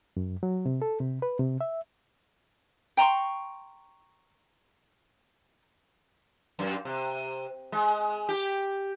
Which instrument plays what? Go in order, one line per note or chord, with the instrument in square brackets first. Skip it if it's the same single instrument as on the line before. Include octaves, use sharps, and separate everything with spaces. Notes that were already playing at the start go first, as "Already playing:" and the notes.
[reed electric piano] F#2
F#3
C3
A4
C3
B4
C3
E5
[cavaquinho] G5 A#5 C6 C#6
[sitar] F#2
C3
G#3
G4